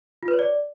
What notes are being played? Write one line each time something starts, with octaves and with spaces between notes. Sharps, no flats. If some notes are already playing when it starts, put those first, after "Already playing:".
F4
B4
C#5
D5